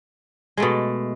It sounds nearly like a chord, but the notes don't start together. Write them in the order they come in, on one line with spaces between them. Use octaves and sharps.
G#3 A3 B2